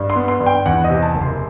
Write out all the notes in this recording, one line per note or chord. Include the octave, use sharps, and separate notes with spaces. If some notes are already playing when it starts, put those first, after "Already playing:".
Already playing: G2
C6
B3
C6
G2
G5
E2 F#5
D#5
C3
A5
F#1
C6